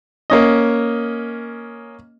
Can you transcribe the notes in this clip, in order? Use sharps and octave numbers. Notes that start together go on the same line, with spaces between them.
A#3 C#4 D#5